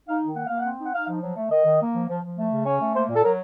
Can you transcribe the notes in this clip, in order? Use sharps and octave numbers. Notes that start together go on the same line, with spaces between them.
D#4 F5
D#3
A#3 F#5
A#3 F5
F#5
C4
D#4 F#5
D#4 F5
F3
F#3
A3
D#3 D#5
D#3
A#3
F3
F3
F3
A3
C#3
C#4 C#5
A3
A#3 C5
A#2
A4
F#3 A#4